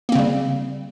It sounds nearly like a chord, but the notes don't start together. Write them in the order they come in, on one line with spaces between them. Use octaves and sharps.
A#3 C4 C#3 G3